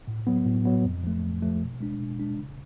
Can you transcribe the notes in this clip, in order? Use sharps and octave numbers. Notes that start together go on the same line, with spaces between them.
A2
F#3 B3
A2
F#3 B3
F2
F3 A3
F2
F3 A3
B2
G#3 D4
B2
G#3 D4
C#3